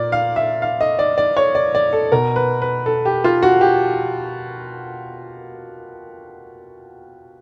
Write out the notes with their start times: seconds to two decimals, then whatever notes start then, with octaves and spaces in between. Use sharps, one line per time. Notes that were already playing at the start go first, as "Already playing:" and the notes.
Already playing: A#2 D5
0.12 F5
0.36 E5
0.62 F5
0.81 D#5
0.99 D5
1.18 D5
1.37 C#5
1.55 D5
1.75 D5
1.93 A4
2.12 B2 A#4
2.36 B4
2.62 B4
2.86 A4
3.05 G4
3.24 F4
3.43 F#4
3.61 G4